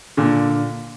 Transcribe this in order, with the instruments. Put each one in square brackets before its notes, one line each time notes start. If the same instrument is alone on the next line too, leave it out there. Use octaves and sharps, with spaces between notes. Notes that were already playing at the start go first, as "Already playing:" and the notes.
[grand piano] A#2 D3